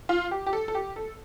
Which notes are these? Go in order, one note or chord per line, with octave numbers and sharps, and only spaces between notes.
F4
G4
G4
A4
A4
G4
A4